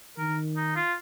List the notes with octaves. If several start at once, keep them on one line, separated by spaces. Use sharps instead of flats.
D#3 A#4
D#4
F4